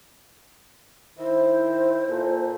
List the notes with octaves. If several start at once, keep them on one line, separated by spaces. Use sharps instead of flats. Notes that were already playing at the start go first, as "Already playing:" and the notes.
D#3 E4 C5
A#2 A4